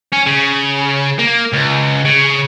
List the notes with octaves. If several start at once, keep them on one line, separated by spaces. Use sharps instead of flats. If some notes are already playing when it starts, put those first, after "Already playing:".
C#4
C#3
A#3
C#2
C#3